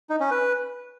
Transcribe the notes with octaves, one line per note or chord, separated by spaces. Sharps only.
D#4
C#4
B4